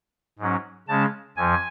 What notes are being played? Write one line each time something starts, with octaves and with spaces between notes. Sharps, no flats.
G#2 F#3 C#4
C#3 G#3 C#4 A5
F2 F3 G#5